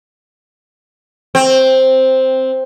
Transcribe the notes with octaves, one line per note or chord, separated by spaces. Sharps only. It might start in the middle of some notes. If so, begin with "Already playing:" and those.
C4